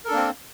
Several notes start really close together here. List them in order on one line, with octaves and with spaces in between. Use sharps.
A#4 A4 D4 A#3 C4